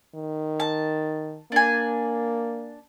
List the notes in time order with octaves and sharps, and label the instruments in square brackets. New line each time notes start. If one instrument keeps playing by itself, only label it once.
[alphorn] D#3
[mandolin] A5
[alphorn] A#3 [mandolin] D4 G#5